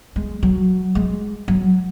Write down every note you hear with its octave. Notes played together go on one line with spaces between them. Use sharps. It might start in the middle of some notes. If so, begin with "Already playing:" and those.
G#3
F#3
G#3
F#3